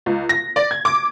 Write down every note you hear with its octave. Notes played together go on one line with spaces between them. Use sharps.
C#2
A#6
D5
G#6
D6